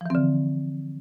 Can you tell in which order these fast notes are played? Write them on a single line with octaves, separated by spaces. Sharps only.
F3 E3 C4 D3